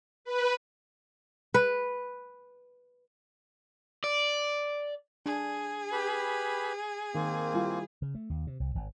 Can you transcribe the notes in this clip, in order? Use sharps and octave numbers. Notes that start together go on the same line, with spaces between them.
B4
B4
D5
D4 G#4
G4 B4 B5
D#3 A#3 C4
G3 E4 F4
C#3
A3
D#2
C3
C2
G#1